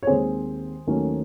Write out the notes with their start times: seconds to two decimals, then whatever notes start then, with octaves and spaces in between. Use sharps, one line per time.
0.03 C#5
0.07 D#2 D#3 G#3 C4 G#4 C5
0.87 D#2 D#3 F#3 A3 C#4